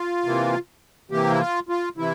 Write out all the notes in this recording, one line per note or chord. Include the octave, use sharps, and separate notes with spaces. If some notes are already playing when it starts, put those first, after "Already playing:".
Already playing: F4
C3 E3 A#3
C3 E3 A#3 G4
E4
F4
F4
C3 E3 E4